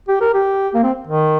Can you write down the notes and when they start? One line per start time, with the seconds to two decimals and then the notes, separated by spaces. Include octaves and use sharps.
0.08 G4
0.21 A#4
0.34 G4
0.74 A#3
0.83 C4
1.07 D#3